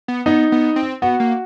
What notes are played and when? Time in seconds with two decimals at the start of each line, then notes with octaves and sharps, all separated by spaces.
0.08 B3
0.26 B3 D#4
0.52 B3
0.76 C4
1.02 B3 F#4
1.20 A#3